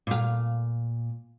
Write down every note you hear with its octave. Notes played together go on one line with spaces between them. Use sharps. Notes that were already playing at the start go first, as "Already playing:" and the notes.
A#2 F5